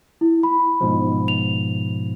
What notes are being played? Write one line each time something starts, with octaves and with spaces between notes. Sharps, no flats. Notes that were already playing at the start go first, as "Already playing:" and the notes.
E4
B5
G#2 B2 F3
F7